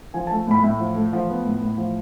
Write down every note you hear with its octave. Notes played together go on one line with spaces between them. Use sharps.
F3 G#5
A5
A3
A2 B5
A2 E5
F3
A3
F3 C5
B3
A2
A2
F3